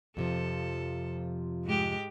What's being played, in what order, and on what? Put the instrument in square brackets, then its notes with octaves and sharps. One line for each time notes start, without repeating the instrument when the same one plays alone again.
[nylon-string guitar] F2 C3 F3 [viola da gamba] A4
[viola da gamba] G#2 G#3 G4